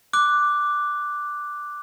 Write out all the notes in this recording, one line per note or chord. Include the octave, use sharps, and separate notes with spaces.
D6 F#6